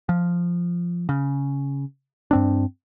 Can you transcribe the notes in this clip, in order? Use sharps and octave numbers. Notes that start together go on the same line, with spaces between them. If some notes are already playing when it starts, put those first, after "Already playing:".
F3
C#3
G2 C4 D4